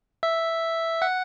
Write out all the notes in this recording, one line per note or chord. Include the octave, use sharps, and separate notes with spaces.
E5
F#5